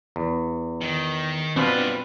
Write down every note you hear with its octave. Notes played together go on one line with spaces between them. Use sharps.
E2
D#3
B2 C4 D4 F4 B4